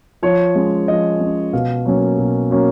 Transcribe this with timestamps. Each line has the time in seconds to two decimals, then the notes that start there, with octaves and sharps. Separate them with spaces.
0.23 F3 C#5
0.55 G#3 C#4
0.88 F3 D#5
1.21 G#3 C#4
1.53 B2 F5
1.86 F#3 A#3 C#4
2.18 B2
2.51 F#3 A#3 C#4